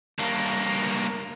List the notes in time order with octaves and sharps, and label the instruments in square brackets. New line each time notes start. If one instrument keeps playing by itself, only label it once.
[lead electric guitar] G2 A#3